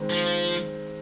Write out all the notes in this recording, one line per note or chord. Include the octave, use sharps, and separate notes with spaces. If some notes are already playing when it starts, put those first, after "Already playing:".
Already playing: D#3 G#3 C4
F3